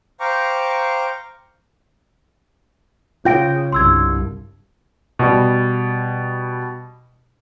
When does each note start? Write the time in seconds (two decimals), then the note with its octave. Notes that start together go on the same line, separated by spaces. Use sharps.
0.20 C5 F5 G5 A#5 C#6 D6
3.25 C#3 F4 G5 G6 A#6 D7
3.73 C2 G2 C6 E6 G#6
5.19 B2 G3